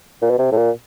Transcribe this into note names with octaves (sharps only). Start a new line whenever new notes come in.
A#2
B2
C3
A2
A#2